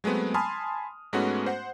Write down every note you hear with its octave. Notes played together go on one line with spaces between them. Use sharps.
F#3 G#3 A3 B3 C4
G#5 A5 B5 C6 D#6 F6
G#2 G#3 A3 B3 C#4 F#4
C5 F#5